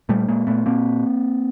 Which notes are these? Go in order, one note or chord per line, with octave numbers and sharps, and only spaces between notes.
A#2 G3 A3
A#2 G#3 A#3
A#2 A3 B3
A#2 A#3 C4